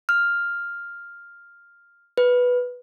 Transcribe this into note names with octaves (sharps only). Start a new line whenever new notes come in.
F6
B4